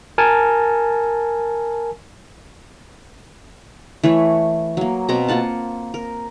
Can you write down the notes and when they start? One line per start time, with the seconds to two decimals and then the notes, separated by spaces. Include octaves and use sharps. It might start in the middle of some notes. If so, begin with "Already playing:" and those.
0.18 A#4 G#5 A5
4.03 E3 A3 B4 C#5
4.77 F#3 A#3
5.09 B2 B3 C4 A#5
5.28 A#3 F4 F#5 A5
5.94 A#4